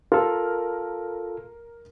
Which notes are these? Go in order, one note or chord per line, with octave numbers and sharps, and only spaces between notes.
F4 A4 A#4 F6